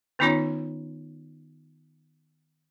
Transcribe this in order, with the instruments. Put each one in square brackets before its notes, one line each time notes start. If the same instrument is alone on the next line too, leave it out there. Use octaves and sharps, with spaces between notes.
[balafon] D#3 B3 C#4 D#4 F4 C#5